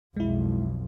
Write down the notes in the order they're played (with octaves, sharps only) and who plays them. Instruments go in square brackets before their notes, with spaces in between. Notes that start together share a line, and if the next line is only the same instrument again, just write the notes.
[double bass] B1 F2 [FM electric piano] G#3 E4